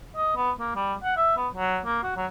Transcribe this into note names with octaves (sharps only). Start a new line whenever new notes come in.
D#5
B3
A#3
G3
F#5
E5
B3
F#3
A#3
F#4
F#3